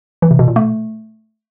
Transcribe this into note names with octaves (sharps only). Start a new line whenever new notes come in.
E3
C3
B2
A#2
A3